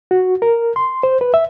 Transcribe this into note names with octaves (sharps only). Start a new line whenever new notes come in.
F#4
A#4
C6
C5
B4
E5